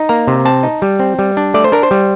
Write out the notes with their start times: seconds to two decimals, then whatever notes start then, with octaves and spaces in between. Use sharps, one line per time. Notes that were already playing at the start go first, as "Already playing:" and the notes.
Already playing: D#4
0.09 A#3 A#5
0.27 C3
0.45 C4 A5
0.63 D#4
0.82 G3
1.00 C4
1.19 G3
1.37 D4
1.54 A3 D5
1.64 C5
1.72 D4 A#4
1.83 C5
1.91 G3